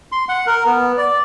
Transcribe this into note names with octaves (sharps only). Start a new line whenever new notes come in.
C6
F#5
A#4
B3
D5